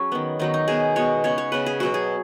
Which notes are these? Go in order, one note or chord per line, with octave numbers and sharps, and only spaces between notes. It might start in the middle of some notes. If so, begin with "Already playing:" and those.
Already playing: F#3 C#4 F#4 G#4
D#3 B3
D#3 F#3 B3 D#4
D#4
B2 B3 G#4
B2 G#3 B3 C#5
C#3 B3 C#5
C#5
C#3 B3 B4
G#4
B2 F#3 B3 F#4
G#4